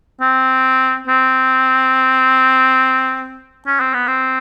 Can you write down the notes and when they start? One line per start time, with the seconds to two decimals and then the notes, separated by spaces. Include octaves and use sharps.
0.21 C4
1.07 C4
3.67 C#4
3.80 C4
3.94 B3
4.08 C4